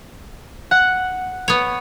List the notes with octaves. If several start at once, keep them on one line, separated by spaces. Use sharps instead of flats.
F#5
B3 C#5